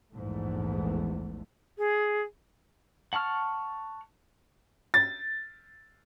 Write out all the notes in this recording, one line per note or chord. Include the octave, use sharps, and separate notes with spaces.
A#1 E2 G#2 A3
G#4
F#5 A5 C#6 F6
A6